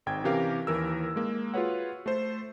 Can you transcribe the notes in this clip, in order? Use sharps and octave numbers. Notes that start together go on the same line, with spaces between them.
G#1 G#2 G5 G#6
C3 E3 C#4 G4 A#4 F5
D#2 E3 A#4 E6
G#3 A#3
F4 F#4 G#4 B4 C#5 F#5
A3 A4 C5